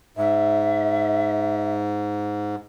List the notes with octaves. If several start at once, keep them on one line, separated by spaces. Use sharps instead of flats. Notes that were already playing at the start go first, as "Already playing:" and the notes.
G#2 E5